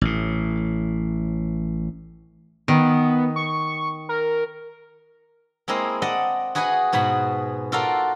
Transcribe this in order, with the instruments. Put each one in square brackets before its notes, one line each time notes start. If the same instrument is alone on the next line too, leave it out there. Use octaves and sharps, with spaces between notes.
[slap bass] A1 A2
[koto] D#3 [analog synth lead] B3
[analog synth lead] C#6
A#4
[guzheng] G#3 A#3 C4 E4 D#5 F5
D5 D#5 F#5 A5
F#4 G#4 B4 D#5 F#5 G#5
G#2 B2 G#4 F#5 B5
F4 F#4 A4 A#4 D5 F5